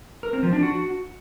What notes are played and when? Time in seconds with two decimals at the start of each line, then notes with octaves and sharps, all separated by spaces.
0.23 A#4
0.33 C4
0.43 F3
0.53 D4
0.63 F#4